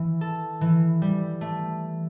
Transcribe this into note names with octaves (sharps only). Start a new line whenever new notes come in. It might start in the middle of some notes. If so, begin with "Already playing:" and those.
Already playing: E3
A4
E3
G3
A3